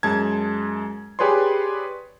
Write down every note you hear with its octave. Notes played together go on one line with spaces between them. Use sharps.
F#2 G#3 A5 G#6
G4 G#4 B4 C#5 D5 C6